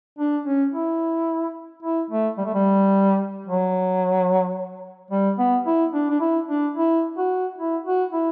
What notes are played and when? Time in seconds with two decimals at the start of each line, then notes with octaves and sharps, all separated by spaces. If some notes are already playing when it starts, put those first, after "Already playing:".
0.18 D4
0.45 C#4
0.72 E4
1.83 E4
2.10 A3
2.38 G3
2.45 A3
2.54 G3
3.47 F#3
5.11 G3
5.38 B3
5.66 E4
5.93 D4
6.10 D4
6.20 E4
6.49 D4
6.75 E4
7.17 F#4
7.58 E4
7.86 F#4
8.13 E4